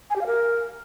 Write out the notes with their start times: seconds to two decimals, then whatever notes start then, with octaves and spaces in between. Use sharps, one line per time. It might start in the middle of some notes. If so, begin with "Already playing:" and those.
0.10 G#5
0.16 G4
0.21 F5
0.27 A#4